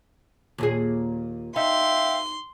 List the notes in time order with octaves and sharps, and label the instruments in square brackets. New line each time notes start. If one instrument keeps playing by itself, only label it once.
[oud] D#2 A#2 G#4
[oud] D#4 [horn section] E5 F5 G5 [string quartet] C6